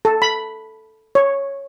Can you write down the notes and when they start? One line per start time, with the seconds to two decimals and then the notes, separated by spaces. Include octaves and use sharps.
0.05 A4
0.22 B5
1.15 C#5